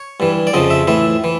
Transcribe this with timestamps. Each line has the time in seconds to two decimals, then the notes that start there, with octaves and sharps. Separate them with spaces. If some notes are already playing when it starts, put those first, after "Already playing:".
Already playing: C#5
0.20 G2 E3
0.47 D5
0.54 F2 C#3 F3 D#5
0.70 E5
0.87 A2 E3 E5
1.24 E3